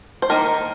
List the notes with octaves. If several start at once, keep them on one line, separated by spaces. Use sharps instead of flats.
C5
D#3 A#3 D#4 A#4